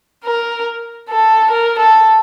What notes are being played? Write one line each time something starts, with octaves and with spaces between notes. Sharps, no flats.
A#4
A4
A#4
A4